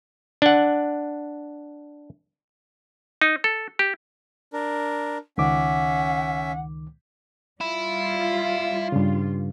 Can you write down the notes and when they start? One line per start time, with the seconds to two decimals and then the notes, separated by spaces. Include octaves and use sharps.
0.42 D4 F#5
3.22 D#4
3.44 A4
3.79 G4
4.53 D4 A#4
5.38 C#2 D#3 C#4 E5 F#5 D6
7.61 G3 E4 F4
8.92 G2 C#3